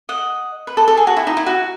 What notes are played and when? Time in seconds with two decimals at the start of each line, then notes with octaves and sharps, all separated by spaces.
0.09 D#5 F#5
0.67 B4
0.77 A4
0.88 A4
0.97 G#4
1.07 F#4
1.17 E4
1.27 D#4
1.37 E4
1.46 F#4